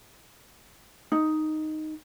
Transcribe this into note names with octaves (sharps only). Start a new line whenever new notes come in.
D#4